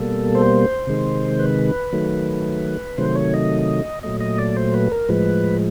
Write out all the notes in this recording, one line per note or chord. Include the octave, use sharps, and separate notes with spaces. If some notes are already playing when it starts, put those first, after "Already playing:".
Already playing: B2 G3 A#3 A4
C5
C3 D#3 G#3
B4
D#3 F#3 A3
C3 D#3 F#3 A3 C5
C#5
D#5
A#2 F#3 A3 D#5
D#5
D5
C5
B4
A#4
A2 F3 G#3 B4